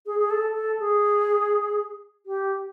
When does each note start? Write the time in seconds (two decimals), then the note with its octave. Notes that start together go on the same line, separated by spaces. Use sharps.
0.06 G#4
0.19 G#4
0.31 A4
0.55 A4
0.80 G#4
2.26 G4